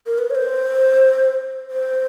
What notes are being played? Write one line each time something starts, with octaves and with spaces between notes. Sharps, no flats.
A#4
B4
C#5
C5
C5